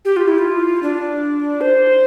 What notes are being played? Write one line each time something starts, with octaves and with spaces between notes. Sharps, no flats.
G4
F4
E4
F4
D4
C5